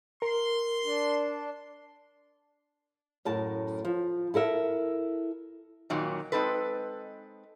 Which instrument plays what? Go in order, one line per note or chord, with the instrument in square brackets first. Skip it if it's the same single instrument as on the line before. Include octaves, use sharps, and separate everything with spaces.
[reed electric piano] A#4 [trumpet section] C6
[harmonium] D4
[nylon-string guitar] F#2 A2 A5
F3
E4 A4 A#4 E5
[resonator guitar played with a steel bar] F2 A#2 D#3 F#3
G#3 C4 D#4 A4 B4